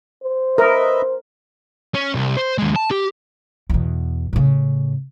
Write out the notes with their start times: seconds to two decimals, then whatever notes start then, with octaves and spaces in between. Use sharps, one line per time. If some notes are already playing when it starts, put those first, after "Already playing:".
0.23 C5
0.58 A#4 B4 D#5 E5
1.94 C#4
2.15 C2
2.37 C5
2.58 D#2 G#3
2.76 A5
2.91 G4
3.69 E2 B2
4.33 A2 C#3